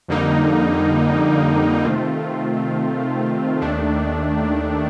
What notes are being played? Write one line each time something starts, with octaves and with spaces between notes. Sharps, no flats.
F2 D3 G3 A#3 D#4
C3 D#3 A3 C4 F4
D#2 D#3 A3 D4